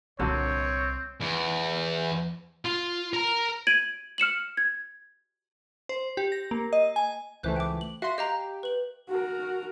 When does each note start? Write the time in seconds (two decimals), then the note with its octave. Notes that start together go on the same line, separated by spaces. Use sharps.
0.19 C2 A#2 D3 F#3 C4 C#5
1.21 E2
2.65 F4
3.14 A#4 A#5
3.67 G#6 D7 D#7 F#7
4.18 F6 C#7 E7 F#7
4.57 G#6
5.89 C5
6.17 G4
6.32 A#6
6.51 A#3
6.73 D#5
6.96 G#5
7.43 C#2 E3 A3 C5 F#6 G6
7.56 G5 D6
7.81 F#7
8.02 F#4 E5 F5 C6
8.18 G4 D#5 F5 A#5
8.63 B4 F#7
9.10 F#4 A#4